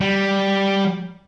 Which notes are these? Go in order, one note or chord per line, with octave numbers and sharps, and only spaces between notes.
G3